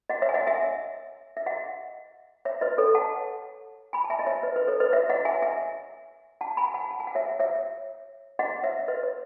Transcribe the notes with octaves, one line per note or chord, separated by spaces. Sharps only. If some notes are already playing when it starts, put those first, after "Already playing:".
D#5 F#5
C#5 E5
G#5
D#5 F#5
E5 G#5
E5
D#5 F#5
C#5 E5
B4 D#5
A4 C#5
F#5 A5
G#5 B5
A5
E5 G#5
D#5
C#5 E5
B4 D#5
B4 D#5
A4 C#5
B4 D#5
C#5 E5
D#5 F#5
E5 G#5
E5 G#5
F#5 A5
G#5 B5
F#5 A5
A5
G#5
F#5
C#5 E5
C#5 E5
D#5 F#5
C#5 E5
B4 D#5
C#5